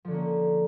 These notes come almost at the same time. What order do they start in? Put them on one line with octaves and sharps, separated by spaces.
F3 D3 C#4 A#3